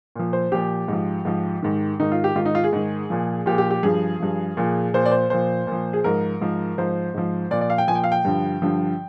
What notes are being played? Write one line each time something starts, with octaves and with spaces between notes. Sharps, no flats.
A#2 F3
C5
A#2 F3 G4
G#2 F3
G#2 F3
G#2 D#3
G#2 D#3 D#4
F4
G4
G#2 D#3 F4
D#4
F4
G#4
G#2 D#3
A#2 F3
A#2 F3 G4
G4
G4
G2 F3 G#4
G2 F3
A#2 F3
A#2 F3 C5
D5
C5
A#2 F3 C5
A#2
F3
G#4
G#2 F3 A#4
G#2 F3
G#2 F3 C5
G#2 F3
A#2 F3 D5
D5
F5
G5
A#2 F3 G#5
G5
F5
G5
G2 D3 F3
G2 D3 F3